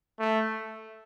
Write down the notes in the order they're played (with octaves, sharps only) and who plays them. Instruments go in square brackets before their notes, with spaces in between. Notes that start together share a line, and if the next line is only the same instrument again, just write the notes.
[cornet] A3